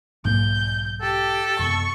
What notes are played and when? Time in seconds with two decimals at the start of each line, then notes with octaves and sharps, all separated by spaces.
0.25 B1 G#2 F#3 A#3 G6
1.02 G4 A4
1.59 F#2 C3 B3 C#6